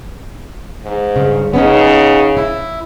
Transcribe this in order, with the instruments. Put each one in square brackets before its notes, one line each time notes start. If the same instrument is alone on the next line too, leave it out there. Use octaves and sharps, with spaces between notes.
[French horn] G#2
[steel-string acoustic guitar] G2 C#3
[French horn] C#3 [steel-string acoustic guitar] B3 C#4 D#4
[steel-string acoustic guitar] E4